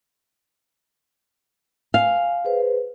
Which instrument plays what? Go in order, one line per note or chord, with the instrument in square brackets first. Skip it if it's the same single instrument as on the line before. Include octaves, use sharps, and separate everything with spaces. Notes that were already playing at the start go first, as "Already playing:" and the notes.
[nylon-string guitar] F5 [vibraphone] G#5
[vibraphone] G#4 B4 C5